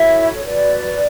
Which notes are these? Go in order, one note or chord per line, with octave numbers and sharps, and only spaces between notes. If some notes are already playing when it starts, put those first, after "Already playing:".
Already playing: E4 F#4 A4 C#5 E5
F#4 B4 D5